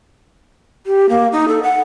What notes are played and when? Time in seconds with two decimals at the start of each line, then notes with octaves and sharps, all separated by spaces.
0.86 G4
1.09 A#3
1.33 D#4
1.48 A4
1.63 F#5